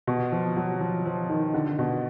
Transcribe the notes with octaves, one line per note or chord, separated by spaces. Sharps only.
B2
F3
F#3
F3
F3
D#3
D3
B2